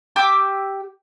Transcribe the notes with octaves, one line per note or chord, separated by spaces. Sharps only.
G4 D6 E6